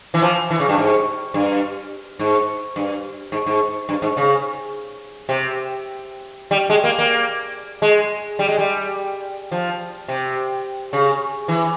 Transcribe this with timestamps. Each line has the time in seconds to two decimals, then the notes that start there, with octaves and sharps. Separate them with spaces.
0.14 E3
0.22 F3
0.51 E3
0.60 C#3
0.69 G2
0.78 G#2
1.34 G2
2.19 G#2
2.76 G2
3.32 G#2
3.46 G#2
3.89 G2
4.02 G#2
4.17 C#3
5.29 C3
6.51 G3
6.70 G#3
6.84 A#3
6.99 A#3
7.82 G#3
8.39 G3
8.48 G#3
8.58 G3
9.52 F3
10.08 C3
10.93 C#3
11.48 E3